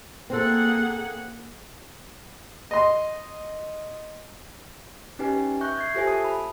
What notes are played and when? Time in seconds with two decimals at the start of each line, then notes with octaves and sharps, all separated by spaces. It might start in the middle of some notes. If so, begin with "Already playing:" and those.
0.30 A#3 C4 G#4 A4 F#5
2.71 D#5 C6
5.19 C#4 D#4 G4 B4 G#5
5.61 E5 C#6 F#6 G6
5.76 E5 G#6 C7
5.94 F4 G4 A4 C5 E5 G#5
6.07 A5 D#6
6.24 B5